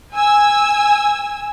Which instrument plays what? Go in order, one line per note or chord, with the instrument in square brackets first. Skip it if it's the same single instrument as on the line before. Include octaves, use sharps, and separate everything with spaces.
[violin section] G#5 E6